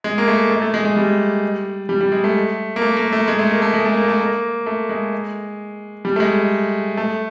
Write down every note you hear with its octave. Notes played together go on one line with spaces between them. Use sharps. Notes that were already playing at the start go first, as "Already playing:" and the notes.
G#3
A#3
A3
A3
A3
G#3
G#3
G3
G3
G3
G#3
A3
A#3
A3
A#3
A3
G#3
A3
A#3
A3
G#3
A3
A#3
A3
A#3
A3
G#3
G3
A3
G#3
A3